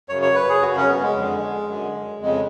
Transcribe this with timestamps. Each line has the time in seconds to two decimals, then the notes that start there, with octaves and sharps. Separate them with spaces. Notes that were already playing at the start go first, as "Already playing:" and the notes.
0.09 F#2 C#3 C#5
0.22 C#5
0.35 B4
0.50 G#4
0.62 F#2 C#3 F#4
0.76 C#4
0.89 B3
1.02 G#3
1.16 F2 D3
1.68 F#2 D3
2.21 F2 C#3 G#3